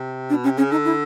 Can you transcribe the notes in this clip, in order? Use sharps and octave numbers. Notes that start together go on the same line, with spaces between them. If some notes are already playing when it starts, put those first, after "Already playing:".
Already playing: C3
D4
B2
C3 C#4
C#3 C#4
D3 D#4
E4